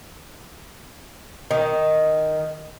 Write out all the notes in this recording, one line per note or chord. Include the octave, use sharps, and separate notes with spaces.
D#3